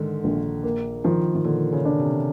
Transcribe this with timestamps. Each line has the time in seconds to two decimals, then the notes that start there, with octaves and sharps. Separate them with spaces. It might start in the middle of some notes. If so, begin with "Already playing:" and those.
Already playing: G#2 D3 D#3
0.24 A#1
0.63 A#3
1.04 D#3 F3
1.35 D#3
1.44 A#2 D3
1.72 C#3
1.85 D4
1.99 C3